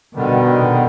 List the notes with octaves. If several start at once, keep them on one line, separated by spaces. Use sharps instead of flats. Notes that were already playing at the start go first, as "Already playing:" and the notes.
B2 D3 D#3 G3